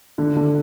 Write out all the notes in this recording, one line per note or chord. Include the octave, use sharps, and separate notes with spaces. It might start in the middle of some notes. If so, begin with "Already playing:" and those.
D3
D3